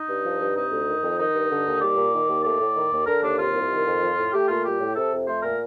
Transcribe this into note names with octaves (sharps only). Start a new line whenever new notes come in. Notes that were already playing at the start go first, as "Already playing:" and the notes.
Already playing: D#4
G2
F3
G2
C3 D#4
D2
D#3
F2
D#3 D#4
G2
D3
D#2
G3 D5
A#2
D#3
D#2
A3 D5
A2
D#3
D#2
D3 A#4
D#2 D4
C3 F4
C2
D#3
F2
F3
A2
A3 G4
A#2 F4
G3 G4
A2
C3 A4
F2
A3 C5
A#2 A#4